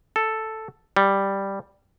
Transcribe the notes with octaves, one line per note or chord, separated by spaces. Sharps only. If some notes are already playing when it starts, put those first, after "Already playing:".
A4
G3